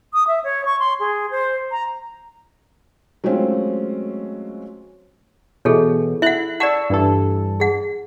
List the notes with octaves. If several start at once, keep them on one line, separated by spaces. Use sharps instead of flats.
D#6
E5
C#5
C#6
C6
G#4
C5
A#5
F#3 G#3 A3 C4 C#4 F4
B2 E3 G#4 A4 C#5
E4 E5 F#5 F#6
D5 F#5 A5 C#6 E6
G2 E3 A4
G#4 F#5